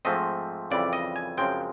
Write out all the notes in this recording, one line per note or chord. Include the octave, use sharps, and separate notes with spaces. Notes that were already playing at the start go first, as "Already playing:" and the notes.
G#2 F3 A3 C4 D#5
F2 C#3 E3 G3 D5
D#5
G#5
F#2 C#3 F3 G#3 C4 G5